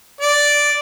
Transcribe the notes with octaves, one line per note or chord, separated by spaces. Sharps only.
D5